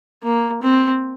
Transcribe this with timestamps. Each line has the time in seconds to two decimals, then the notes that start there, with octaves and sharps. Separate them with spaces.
0.23 A#3
0.62 C4